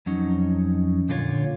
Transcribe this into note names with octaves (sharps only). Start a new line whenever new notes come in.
F2 F#3 C#4 D#4
A#2 D3 F4 A#4 C#5